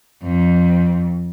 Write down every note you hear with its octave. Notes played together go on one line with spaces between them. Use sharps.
F2